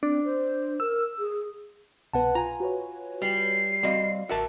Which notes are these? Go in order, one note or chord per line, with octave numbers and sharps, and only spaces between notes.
C4 D4
C5
A#4 E6
G#4
C2 B2 B3 B4 F#5 A5
F4 B4 G#5 A#5
F#4 B4 C#5
G3 C7
G3 C4 F#4 D5 D#5 F5
A1 F#4 A#4 E5 A5 E6